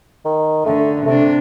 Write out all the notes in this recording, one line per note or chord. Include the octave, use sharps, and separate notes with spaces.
D#3
D3 A3
C3 A3 D4